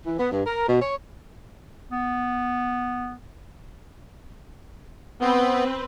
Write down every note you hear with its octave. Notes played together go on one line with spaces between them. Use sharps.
E3
B3
G2
A#4
B2
C#5
B3
B3 C4 B4